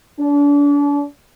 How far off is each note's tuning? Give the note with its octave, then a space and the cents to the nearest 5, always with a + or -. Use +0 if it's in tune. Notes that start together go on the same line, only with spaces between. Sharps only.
D4 -35